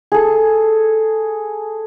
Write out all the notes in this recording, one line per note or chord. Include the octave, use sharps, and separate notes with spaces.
G#4 A4